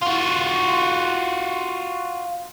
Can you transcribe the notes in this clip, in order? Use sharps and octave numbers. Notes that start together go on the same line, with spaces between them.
F4 F#4